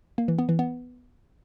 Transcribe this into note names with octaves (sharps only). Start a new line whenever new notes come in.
A#3
E3
B3
E3
B3